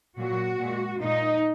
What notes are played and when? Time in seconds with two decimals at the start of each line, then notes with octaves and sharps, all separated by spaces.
0.18 A#2 F#3 A#3 F#4
0.59 A#2 G#3
1.00 A#2 A#3 D#4